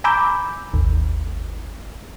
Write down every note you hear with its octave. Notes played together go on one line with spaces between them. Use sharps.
G#5 A#5 B5 D6 E6 G6
G#1 D#2